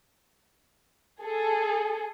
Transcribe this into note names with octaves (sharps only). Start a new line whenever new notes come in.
G#4 A4